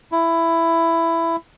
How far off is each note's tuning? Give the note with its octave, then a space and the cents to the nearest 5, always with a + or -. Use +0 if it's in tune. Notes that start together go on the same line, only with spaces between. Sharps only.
E4 +10